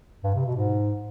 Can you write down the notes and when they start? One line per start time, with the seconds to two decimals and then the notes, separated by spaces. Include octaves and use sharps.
0.24 G2
0.35 C3
0.45 B2
0.56 G#2